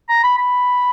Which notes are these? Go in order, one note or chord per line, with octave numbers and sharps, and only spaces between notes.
A#5
B5
B5